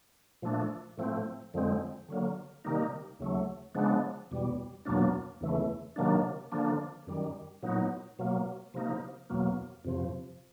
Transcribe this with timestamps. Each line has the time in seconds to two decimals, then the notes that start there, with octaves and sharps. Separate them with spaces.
0.42 A#2 F3 A3 D4
0.97 A2 F3 A3 C4
1.54 F2 D3 F3 G#3 C4
2.09 D3 F#3 A#3
2.64 C3 D#3 G3 A#3 D#4
3.19 D#2 C#3 F#3 A3
3.75 C#3 F3 G#3 B3 D4
4.31 E2 B2 G3
4.85 E2 B2 F#3 A#3 D4
5.41 E2 C#3 E3 A3
5.96 C3 D#3 F#3 A#3 D4
6.52 D3 F3 A#3 D4
7.07 F#2 D#3 G3
7.63 A#2 F#3 B3 D#4
8.19 B2 F#3 A#3
8.74 C3 F3 A#3 D#4
9.30 E2 B2 F#3 A#3
9.85 F2 C3 F3